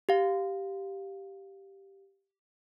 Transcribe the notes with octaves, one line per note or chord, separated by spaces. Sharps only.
G4 F5